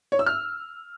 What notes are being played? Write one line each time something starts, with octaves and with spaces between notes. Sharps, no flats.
C#5
E6
F6